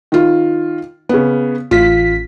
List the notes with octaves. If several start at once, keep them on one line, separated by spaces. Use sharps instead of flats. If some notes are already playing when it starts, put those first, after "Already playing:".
D#3 F4
C#3 B3
A1 F4 B6